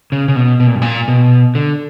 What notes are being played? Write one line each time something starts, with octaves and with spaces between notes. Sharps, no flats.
C#3
C#3
B2
B2
A#2
G2
A#2
B2
D3